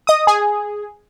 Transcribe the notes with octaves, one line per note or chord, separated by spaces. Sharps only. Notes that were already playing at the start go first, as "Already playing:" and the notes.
D#5 D#6
G#4